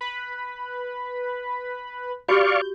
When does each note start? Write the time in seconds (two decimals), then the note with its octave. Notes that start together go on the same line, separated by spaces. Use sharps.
0.01 B4 B5
2.28 F#4 G4 D5 F5 C#6 G6